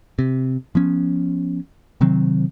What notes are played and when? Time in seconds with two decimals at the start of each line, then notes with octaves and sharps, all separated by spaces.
0.19 C3
0.75 F3 B3 C#4
2.01 C3 D#3 F#3 C4